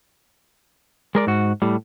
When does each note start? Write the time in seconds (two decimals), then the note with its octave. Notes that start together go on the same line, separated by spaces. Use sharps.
1.15 G#3 A#4 D5
1.27 G#2 F#4
1.62 A2 G3